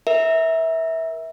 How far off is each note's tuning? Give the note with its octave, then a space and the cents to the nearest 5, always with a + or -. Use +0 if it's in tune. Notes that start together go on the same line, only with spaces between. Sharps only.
A#4 +30 E5 -20